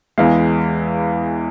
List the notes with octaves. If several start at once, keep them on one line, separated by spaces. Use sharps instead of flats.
E2 E3 G#3 F5